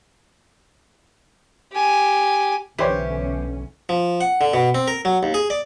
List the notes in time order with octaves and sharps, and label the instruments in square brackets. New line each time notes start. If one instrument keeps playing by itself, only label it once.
[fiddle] G4 G#5
[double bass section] B1 D3 C#4 [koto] E3 [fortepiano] G4 C5 C#5
[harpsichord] F3
F#5
D3
B2
C4
A#4
F#3
D#2
G#4
D5